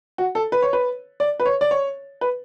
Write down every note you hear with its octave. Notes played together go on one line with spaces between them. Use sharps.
F#4
A4
B4
C#5
B4
D5
B4
C#5
D5
C#5
B4